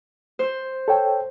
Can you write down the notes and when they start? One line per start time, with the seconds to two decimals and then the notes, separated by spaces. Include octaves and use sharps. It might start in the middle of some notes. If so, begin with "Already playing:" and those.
0.39 C5
0.88 A4 C#5 G5